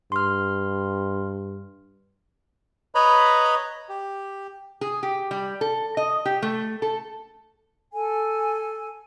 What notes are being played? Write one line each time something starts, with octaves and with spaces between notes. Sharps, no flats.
G2 C6 F6
B4 C#5 D#5 A#5 B5
G4
G#4
G4
G3
A4
D#5
G4
A3
A4
A4 G#5